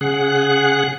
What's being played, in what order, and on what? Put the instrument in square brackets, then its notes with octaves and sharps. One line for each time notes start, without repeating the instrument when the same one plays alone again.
[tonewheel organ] C#3 G#4 F#5 F#6